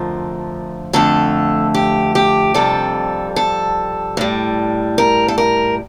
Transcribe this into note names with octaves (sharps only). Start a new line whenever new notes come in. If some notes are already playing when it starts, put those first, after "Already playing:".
Already playing: F2 D3 F3 A3 A#4
F2 D3 A3 A4
G4
G4
F2 C3 G3 A4
A4
A2 G3
A#4
A4
A#4